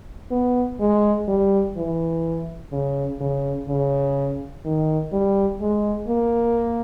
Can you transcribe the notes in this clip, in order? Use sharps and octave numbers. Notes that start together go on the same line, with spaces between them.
B3
G#3
G3
E3
C#3
C#3
C#3
D#3
G3
G#3
A#3